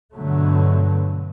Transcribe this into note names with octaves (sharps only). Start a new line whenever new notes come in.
G2 B2 D3 F#3 A3